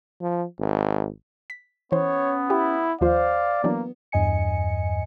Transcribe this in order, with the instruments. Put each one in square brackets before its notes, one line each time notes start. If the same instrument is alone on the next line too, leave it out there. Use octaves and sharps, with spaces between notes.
[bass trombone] F3
G#1
[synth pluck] B6
[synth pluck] E3 C5 [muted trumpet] B3 [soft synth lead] C#4 [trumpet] C#5
[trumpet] E4 [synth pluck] G4
[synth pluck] D#2 F3 F4 [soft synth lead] C5 [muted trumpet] D5 [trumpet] F5
[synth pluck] E3 F#3 D4 [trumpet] A#3 [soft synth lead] B3
[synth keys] E2 G2 D#5 G#5 C#7